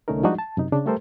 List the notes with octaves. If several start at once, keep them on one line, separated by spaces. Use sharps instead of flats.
C2 D3 A3 C#4 D#4 A#4
F3 G3 G#3 D4 D#4 F#4
A5
F#2 C3 D#4
C#3 D4
G3 A3 G4 A4 A#4 C5